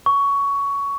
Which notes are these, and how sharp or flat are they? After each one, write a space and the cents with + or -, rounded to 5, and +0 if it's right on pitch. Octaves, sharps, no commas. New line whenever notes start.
C#6 +15